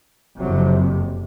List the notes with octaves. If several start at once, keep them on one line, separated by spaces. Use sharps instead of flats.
F#1 F2 C3 F#3